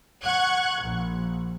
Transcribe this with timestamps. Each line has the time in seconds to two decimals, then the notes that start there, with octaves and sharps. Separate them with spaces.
0.23 F#5 C#6 F#6 G#6
0.82 A#1